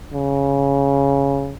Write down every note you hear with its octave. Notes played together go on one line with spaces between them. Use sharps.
C#3